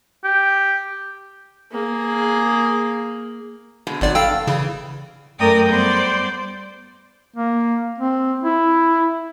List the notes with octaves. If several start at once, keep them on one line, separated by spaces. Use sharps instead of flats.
G4
A#3 G#4
B2 D3 G#3
G#1 G#2 C3 F#3 D5
G2 A4 F5 G5 E6
C#3 E3
F#2 A3 A#4 D5 G5 D#6
G3 B3 C5 D5 G6
A#3
C4
E4